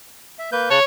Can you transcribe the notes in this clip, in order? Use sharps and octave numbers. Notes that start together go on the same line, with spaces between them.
E5
A#3 B4 G6
C#3 C#5 A5 F#6